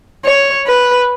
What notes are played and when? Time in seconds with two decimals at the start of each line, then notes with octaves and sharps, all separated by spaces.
0.25 C#5
0.67 B4